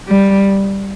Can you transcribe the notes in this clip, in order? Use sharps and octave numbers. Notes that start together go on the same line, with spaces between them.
G3